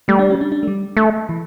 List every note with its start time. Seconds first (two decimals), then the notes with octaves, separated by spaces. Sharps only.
0.08 G3 A3
0.19 D4
0.30 C#4
0.41 D4
0.52 D4
0.63 A3
0.67 G3
0.97 A3
1.29 E3